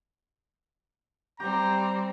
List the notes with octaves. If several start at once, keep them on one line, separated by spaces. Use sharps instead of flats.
G3 C4 G4 A#5